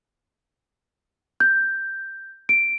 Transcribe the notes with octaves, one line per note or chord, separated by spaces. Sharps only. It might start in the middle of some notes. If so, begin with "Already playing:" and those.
G6
D7